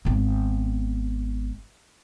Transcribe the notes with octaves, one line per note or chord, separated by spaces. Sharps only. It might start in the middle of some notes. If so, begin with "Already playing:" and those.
G#1 B3